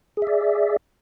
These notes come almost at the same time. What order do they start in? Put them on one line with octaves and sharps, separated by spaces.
G#4 E5 D5